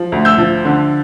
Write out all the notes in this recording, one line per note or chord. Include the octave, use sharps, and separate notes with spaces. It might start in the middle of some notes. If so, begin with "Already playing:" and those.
Already playing: F3
D2
E6 G6
F3
D3